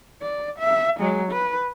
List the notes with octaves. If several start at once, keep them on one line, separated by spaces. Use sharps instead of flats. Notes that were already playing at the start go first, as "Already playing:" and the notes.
D5
E5
F#3 G#3
B4